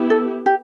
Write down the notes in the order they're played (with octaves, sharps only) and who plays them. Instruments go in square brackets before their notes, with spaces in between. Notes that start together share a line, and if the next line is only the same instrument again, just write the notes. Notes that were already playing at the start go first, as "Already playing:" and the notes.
Already playing: [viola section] B3 E4 G4
[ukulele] A4
G4